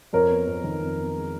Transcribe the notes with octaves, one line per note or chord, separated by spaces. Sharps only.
F2 A#4 C#5
B3
F2
D#3
F2
B3
G#3